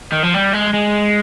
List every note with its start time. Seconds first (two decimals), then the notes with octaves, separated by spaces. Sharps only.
0.12 D#3
0.24 F3
0.34 G3
0.53 G#3
0.73 G#3